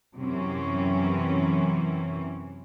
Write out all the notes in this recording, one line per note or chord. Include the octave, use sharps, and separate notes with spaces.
F#2 C3 E3 C4 C#4